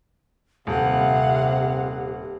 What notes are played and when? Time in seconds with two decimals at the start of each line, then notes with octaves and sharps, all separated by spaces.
0.67 D#1 C3 G4 F5 F#5